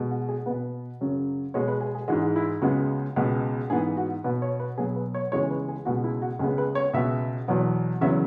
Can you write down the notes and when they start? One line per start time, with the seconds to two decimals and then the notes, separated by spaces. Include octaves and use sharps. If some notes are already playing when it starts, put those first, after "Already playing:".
Already playing: B2 G#3 B3
0.11 F#4
0.29 G#4
0.46 B2 B3 B4
1.01 F#2 C#3 F#3
1.54 B2 G#3 B3 C#5
1.68 B4
1.81 G#4
1.95 G#4
2.08 G#2 E3 G#3 F#4
2.36 E4
2.62 C#2 C#3 G#3 B3 F#4
3.16 C#2 B2 G#3 B3
3.70 G#2 E3 B3 G#4
3.97 F#4
4.24 B2 B3 B4
4.42 C#5
4.60 B4
4.78 B2 F#3 B3 G#4
4.96 B4
5.14 C#5
5.32 C#2 C#3 E3 G#3 B3 C#5
5.43 G#4
5.50 B4
5.68 G#4
5.85 C#2 B2 G#3 B3 F#4
6.04 E4
6.22 F#4
6.39 C#2 C#3 G#3 B3 G#4
6.58 B4
6.75 C#5
6.93 C#2 B2 B3 E5
7.48 E2 B2 F#3 B3
8.01 E2 C#3 F#3 B3 E5